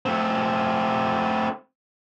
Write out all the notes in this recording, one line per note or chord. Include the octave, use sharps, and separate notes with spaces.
A3 C4